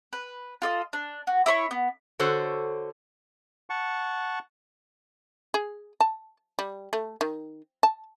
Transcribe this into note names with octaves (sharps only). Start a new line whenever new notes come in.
B4
F4 A4 D#5
D4
F#4
E4 C#5 C6 C#6
B3
D3 F#4 A4 C5 C#5
F#5 A5 C#6
G#4
A5
G3
A3
D#3
A5